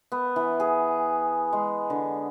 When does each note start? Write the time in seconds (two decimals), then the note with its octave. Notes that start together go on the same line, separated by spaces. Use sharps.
0.12 B3
0.36 E3
0.60 G#4
1.53 G#3
1.90 D3